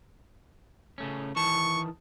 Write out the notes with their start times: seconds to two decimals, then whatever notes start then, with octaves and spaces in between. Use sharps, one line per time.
0.98 C#3 A3 C#4
1.36 D#3 E3 A5 C#6